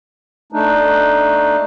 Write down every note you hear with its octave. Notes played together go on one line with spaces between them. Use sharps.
A3 D4 D#4